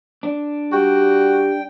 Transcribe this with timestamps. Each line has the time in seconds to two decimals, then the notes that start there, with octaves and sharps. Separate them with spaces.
0.23 D4
0.72 G3 F#4 G5